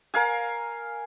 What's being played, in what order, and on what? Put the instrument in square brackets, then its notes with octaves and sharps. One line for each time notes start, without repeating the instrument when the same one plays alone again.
[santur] A#4 F5 G#5